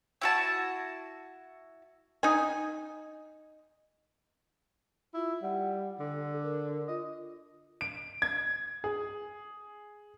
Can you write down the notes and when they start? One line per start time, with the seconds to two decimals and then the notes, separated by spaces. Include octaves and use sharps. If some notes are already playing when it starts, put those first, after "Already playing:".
0.21 E4 F#4 A5
2.23 D#4 G#5
5.14 E4 F4
5.42 G3 F#5
6.00 D3 A4
6.43 A#4
6.88 F4 D#5
7.81 D7
8.22 G#6
8.84 G#4